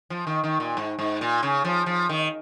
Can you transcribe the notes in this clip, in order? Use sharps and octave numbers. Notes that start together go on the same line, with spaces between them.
F3
D#3
D#3
A#2
G#2
G#2
A#2
C#3
F3
F3
D#3